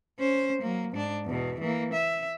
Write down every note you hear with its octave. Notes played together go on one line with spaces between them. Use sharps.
C#4 C5
F#3 A#3
G#2 D4
E2 B2
E3 A#3
E5